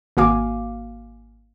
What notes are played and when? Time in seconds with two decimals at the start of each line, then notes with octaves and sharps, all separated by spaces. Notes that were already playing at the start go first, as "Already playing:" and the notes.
0.17 G#1 A#3 F#4 F5 G#5 D6